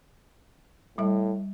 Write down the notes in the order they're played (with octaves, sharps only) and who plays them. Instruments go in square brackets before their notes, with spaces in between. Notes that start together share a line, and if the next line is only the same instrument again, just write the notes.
[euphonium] A2 [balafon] G3 E5